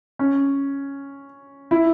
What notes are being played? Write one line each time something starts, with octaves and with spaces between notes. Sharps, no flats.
C#4
E4